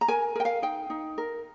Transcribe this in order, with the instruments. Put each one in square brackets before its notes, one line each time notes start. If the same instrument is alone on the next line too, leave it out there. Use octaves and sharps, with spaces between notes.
[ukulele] A#5
A#4 G#5
A#4 G5
F5
D#4 G5
D#4
A#4